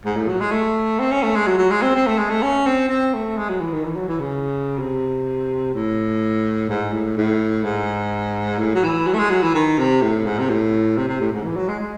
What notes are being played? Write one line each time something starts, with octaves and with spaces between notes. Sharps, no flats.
G#2
A2
F#3
G#3
A3
C4
C#4
A3
G#3
F#3
F#3
G#3
C4
C4
A3
G#3
A3
C#4
C4
C4
A3
G#3
F#3
E3
D#3
E3
F#3
E3
C#3
C3
A2
G#2
A2
A2
G#2
A2
F#3
E3
F#3
A3
G#3
F#3
E3
D#3
C3
A2
G#2
C3
A2
C3
C3
A2
G#2
E3
F#3
G#3
G#3